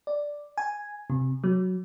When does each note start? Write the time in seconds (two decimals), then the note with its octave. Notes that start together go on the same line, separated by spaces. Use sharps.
0.07 D5
0.58 G#5
1.10 C3
1.44 F#3